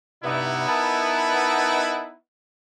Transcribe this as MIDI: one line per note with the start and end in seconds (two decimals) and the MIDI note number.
0.24 0.68 43
0.24 0.68 48
0.24 2.15 59
0.24 2.15 63
0.24 2.15 64
0.69 2.05 70
0.69 2.05 71
0.69 2.05 81